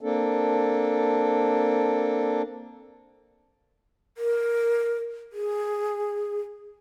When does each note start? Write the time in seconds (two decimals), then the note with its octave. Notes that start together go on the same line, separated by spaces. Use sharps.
0.01 A#3 C4 D4 A4
4.17 A#4
5.33 G#4